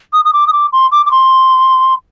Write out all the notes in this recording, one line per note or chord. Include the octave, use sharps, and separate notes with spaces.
D#6
D#6
D6
D#6
D6
C6
D6
D6
C6